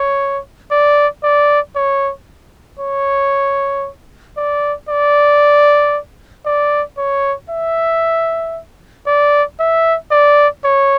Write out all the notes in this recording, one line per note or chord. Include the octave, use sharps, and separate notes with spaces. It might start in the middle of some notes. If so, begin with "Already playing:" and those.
Already playing: C#5
D5
D5
C#5
C#5
D5
D5
D5
C#5
E5
D5
E5
D5
C#5